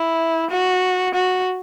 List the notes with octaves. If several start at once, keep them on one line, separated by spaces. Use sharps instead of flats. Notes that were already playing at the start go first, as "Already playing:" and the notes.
Already playing: E4
F#4
F#4